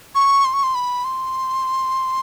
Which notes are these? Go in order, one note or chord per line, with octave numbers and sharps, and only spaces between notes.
C#6
C6
C#6
C6
B5
C6